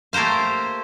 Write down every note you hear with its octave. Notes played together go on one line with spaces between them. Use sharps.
A3 A#3 G4 C5 F5